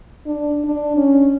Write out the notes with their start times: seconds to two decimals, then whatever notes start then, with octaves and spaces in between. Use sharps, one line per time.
0.26 D4
0.65 D4
0.97 C#4